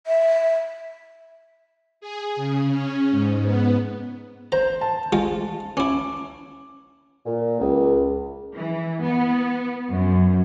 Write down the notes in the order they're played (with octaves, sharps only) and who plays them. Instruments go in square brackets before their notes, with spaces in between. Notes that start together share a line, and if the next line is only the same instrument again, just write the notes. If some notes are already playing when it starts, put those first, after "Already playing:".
[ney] E5
[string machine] G#4
C#3
C#4
G#2
B3
[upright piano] C5 [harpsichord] A#5
[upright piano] A5
[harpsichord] G#3 F4
[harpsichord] C#4 E4 [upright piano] D6
[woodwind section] A#2
C#2
[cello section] E3
B3
F#2